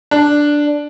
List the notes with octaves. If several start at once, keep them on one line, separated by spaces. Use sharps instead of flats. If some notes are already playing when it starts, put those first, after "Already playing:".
D4